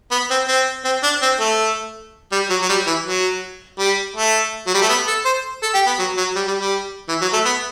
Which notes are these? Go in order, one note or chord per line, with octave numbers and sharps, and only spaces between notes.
B3
C4
C4
C4
D4
C4
A3
G3
F#3
F#3
G3
E3
F#3
G3
A3
F#3
G3
A3
B3
A4
C5
A4
G4
B3
F#3
F#3
G3
G3
G3
E3
F#3
A3
B3